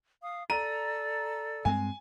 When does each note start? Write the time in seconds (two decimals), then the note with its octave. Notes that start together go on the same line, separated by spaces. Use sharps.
0.23 F5 D#6
0.50 A4 D5 A#5 E6 D#7
1.65 G2 G#3 C4 G#5